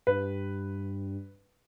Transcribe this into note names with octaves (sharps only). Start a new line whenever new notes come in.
G2 B4